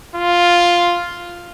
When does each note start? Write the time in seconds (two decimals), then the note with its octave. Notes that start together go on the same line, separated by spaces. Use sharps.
0.16 F4